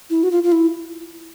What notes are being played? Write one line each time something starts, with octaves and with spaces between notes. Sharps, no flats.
E4
F#4
F4
F4
E4